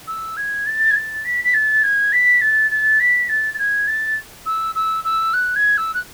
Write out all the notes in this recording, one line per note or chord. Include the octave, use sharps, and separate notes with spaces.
E6
G#6
A6
G#6
A6
B6
B6
A6
G#6
B6
A6
A6
B6
A6
A6
G#6
A6
E6
E6
E6
F#6
G#6
E6
F#6